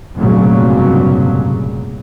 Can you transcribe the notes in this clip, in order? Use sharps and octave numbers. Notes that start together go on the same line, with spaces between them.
F1 G2 A#2 C#3 F#3